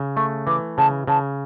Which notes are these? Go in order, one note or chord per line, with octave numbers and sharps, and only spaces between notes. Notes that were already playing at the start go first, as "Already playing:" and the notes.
Already playing: C#3
A3 C#6
E3 D6
C#3 A5
C#3 A5